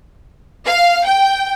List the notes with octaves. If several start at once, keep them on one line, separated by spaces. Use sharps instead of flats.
F5
G5